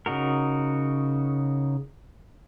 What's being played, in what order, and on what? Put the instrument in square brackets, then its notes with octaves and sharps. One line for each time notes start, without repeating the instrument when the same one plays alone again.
[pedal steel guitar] C#3 D#4 F#4 A#4